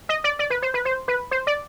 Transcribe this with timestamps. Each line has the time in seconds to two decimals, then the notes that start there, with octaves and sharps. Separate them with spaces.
0.09 D#5
0.24 D5
0.39 D5
0.50 B4
0.62 C5
0.74 B4
0.85 C5
1.08 B4
1.31 C5
1.47 D5